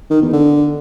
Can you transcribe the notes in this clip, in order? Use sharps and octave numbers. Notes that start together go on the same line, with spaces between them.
D#3
E2
D3